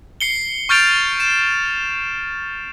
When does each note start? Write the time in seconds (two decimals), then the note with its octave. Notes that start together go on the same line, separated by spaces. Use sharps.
0.20 C7 C#7 G7
0.69 C#6 F6 G6 A6 D7 F7
1.20 C7 E7